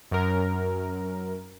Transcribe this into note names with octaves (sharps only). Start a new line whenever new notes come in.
F#2 A#4